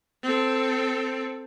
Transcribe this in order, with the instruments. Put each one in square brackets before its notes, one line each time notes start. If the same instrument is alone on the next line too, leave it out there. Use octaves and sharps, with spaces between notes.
[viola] C4 A4